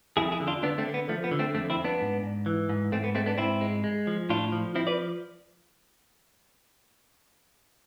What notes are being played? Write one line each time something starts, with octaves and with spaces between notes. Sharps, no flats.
F2 E4 G#4
E4 G#4
D3
D4 F4
D3 B3 D4
A3 C4
D3
B3
F3 A3
B3
D3
A3 C4
F2 A3 C4
C4 E4
F2
B3 D4
G#2
G#2
E3
G#2
G#2 A3 C4
B3
G#3 A3 C4
B3 D4
G#2 C4 E4
G#3
G#3
F3
A2 D4 F4
F3
F3 C4 E4
B4 D5